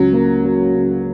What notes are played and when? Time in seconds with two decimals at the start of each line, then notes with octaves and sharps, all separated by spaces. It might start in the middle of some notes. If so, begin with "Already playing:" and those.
Already playing: C#2 C#3 F#3
0.13 A#3
0.43 F#3
0.75 C#3